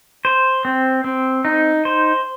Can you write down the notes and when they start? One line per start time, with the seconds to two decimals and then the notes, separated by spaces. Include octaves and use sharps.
0.25 C5
0.65 C4
1.04 C4
1.45 D#4
1.85 C5